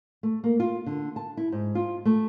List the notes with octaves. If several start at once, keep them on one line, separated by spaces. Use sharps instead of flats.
A3
A#3
F4
D3
A5
E4
G#2
F4
A3